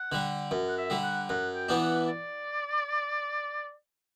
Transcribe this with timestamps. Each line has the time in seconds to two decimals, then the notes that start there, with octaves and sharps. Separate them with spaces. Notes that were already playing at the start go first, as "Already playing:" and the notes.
Already playing: F#5
0.12 D3 G3
0.51 F#2
0.69 F#5
0.77 E5
0.90 D3 G3
1.03 F#5
1.29 F#2 F#5
1.55 G5
1.69 E3 B3 D4
1.82 F#5
2.08 D5